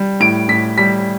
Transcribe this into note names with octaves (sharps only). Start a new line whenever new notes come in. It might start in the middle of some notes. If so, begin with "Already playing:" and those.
Already playing: G3
A2 D7
A2 B6
G3 B6